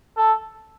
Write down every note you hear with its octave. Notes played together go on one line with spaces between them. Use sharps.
A4